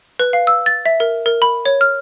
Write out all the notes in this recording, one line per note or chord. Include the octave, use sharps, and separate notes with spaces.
B4
F5
E6
A6
E5
A#4
A#4
B5
C#5
F6